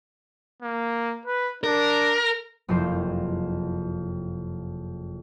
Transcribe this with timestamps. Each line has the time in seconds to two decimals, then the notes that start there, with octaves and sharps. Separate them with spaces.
0.62 A#3
1.26 B4
1.64 D4 A#4
2.68 F#1 F2 C3 E4 C5 G6